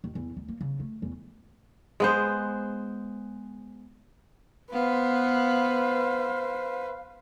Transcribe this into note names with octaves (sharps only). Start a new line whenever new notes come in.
D#2
E2
D2
A#3
C#3
A3
E2
G#3 B3 C5
B3 B4 C5 F5